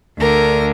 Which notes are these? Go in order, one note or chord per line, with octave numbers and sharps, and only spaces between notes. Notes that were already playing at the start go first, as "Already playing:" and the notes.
D2 D3 A#4